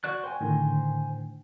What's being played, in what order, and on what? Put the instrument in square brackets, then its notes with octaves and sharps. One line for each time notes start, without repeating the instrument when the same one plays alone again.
[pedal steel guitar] F#4 D5 F#6
C5 G5 G#5
[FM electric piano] A2 D3 D#3